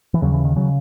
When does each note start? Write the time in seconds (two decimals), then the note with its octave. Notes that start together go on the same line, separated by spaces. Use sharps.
0.14 E3
0.22 D#2 C#3 F#3
0.34 E3
0.45 D#3
0.56 C#3 F#3